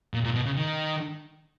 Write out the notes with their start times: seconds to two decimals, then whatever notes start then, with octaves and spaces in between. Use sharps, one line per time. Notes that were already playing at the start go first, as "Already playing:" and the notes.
0.14 A#2
0.24 A#2
0.35 B2
0.46 C#3
0.57 D#3